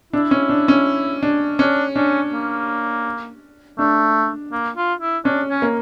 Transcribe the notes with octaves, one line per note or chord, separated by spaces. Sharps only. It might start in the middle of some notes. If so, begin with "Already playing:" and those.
D4 E4
C#4
D4
C#4
D4
C#4 D4
C#4 D4
A#3
A3 D4
A#3
F4
E4
C#4 D4
C#4
A#3